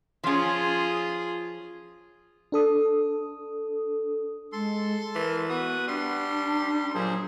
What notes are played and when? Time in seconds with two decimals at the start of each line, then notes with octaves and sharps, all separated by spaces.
0.24 F3 C#4 F4 G#4
2.52 D4 A4 D#6
4.52 G#3 A4 C6
5.15 E3 A#4
5.49 B3 F#4 B4 D#6
5.87 G3 D4 C6
6.95 A#2 F#3 G#4 C5